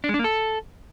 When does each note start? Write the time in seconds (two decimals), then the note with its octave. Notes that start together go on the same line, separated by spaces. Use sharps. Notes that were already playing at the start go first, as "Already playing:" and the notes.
0.04 D4
0.09 G#3
0.14 D4
0.19 A#3
0.24 A4